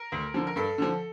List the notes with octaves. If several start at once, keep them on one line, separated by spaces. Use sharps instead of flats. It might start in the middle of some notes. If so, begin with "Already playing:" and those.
Already playing: A#4
D2
D3 F3
A#4
G2 A4
D3 F3